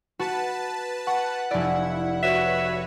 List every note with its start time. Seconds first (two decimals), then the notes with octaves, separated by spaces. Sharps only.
0.19 F#4 B4 A5
1.07 F#5 C#6
1.51 F1 E4 D5
2.23 F#4 B4 C#5 E5